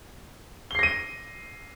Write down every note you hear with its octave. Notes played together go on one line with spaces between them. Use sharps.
A#6 C7 D#7 G7